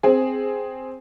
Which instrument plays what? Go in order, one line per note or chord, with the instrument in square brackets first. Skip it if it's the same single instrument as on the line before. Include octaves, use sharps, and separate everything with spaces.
[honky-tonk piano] C4 G#4